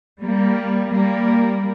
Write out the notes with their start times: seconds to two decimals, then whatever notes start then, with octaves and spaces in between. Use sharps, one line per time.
0.21 G3 A#3
0.92 G3 A#3